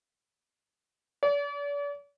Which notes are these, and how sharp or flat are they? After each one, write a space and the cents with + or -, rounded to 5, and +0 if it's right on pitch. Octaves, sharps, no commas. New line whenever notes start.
D5 -40